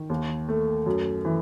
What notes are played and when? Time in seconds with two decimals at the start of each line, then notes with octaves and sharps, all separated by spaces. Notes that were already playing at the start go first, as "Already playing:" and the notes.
Already playing: D#3
0.10 D#2
0.49 A3
0.86 F#2
1.25 E3